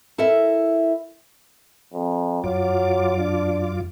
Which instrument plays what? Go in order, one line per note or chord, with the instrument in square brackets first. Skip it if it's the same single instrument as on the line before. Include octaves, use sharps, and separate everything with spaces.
[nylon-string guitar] E4 A4 A#4 E5
[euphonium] F2
[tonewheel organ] F#2 F4 D6 [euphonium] F#3
[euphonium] D4